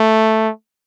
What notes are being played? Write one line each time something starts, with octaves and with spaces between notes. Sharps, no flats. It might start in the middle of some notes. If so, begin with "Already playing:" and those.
Already playing: A3